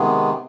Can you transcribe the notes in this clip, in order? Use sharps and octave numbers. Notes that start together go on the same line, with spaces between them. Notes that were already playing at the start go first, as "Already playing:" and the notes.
Already playing: C3 D#3 G#3 B3